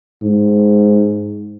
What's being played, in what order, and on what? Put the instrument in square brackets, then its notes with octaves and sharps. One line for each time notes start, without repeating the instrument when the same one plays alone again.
[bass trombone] G#2